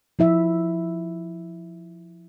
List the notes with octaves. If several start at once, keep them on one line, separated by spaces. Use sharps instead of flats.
F3 E4 E5